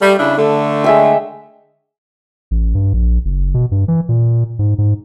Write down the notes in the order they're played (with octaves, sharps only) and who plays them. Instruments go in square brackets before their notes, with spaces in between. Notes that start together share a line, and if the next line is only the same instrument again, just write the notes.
[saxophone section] G3 A3
C#3 D4 E4
D3 A3
[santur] G#3 E5 G5
[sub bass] A1
G2
A#1
F#1
B2
G2
E3
A#2
G#2
G#2